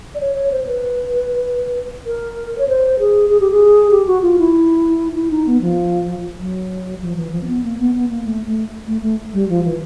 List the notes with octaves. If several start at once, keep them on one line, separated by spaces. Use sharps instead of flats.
D5
C#5
C#5
C5
B4
A#4
C#5
C5
G#4
G#4
G4
G#4
G4
F#4
F4
E4
E4
D#4
B3
F3
F#3
F3
E3
F3
C4
B3
A#3
B3
B3
A#3
A3
A3
A3
A3
G3
F3
E3